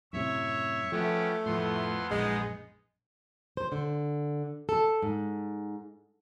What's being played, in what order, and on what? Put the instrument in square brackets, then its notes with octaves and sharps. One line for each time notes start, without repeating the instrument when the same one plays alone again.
[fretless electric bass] F#2 A2 C3 [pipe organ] C#5 E5
[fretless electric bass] F3 [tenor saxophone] A3 [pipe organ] B3 C#4 G4
[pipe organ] F2 B3 C6 [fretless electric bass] A2 F3
[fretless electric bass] A#1 F#2 [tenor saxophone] G#3 [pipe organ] B3 D#4 G#4
[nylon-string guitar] C5
D3
A4
G#2